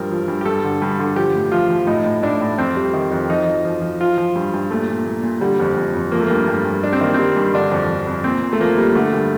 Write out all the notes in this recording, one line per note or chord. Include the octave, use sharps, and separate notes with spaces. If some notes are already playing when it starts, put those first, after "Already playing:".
Already playing: G2 F3 A#4
F3
G2
G4
G2 A4
D3
G2
D3
F3 G4
A2
F3 F4
F3
A2 D#4
A2
A2 D4
A2
F2 C4
G3
D#3
F2
F3 D#4
F3
F3
F3
F3 F4
F3
G2
G2
A#2 A3
A#2
A#2
A#2
D3 G3
F2
F2
F2
F3 A#3
A3
G2 A#3
G2
G2
G3 D4
C4
D#3 A#3
G3 C4
G2
D3 D4
F2
F2
F2
A#2 C4
A#2
A3
F3 A#3
A#2 G3
D3 A3
G2